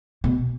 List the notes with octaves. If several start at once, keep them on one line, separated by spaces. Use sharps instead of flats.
B2